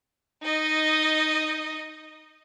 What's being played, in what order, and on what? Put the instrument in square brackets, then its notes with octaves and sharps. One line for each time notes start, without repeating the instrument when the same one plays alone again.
[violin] D#4 D#5